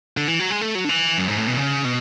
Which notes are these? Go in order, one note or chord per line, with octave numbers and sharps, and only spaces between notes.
D3
E3
F#3
G#3
A3
F#3
D3
E3
F#2
G#2
A2
B2
C#3
B2